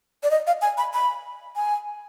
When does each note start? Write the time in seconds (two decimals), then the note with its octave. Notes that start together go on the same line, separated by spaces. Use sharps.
0.23 D5
0.31 D#5
0.47 F5
0.62 G#5
0.78 B5
0.94 B5
1.56 G#5